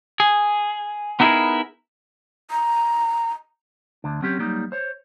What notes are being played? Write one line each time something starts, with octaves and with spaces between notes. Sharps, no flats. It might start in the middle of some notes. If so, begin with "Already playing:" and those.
G#4
B3 D#4 E4 G4 G#4 A#4
A#5
D2 D4
F#3 C4 C#4 G4
F#3 G3 A#3 D#4
C5 C#5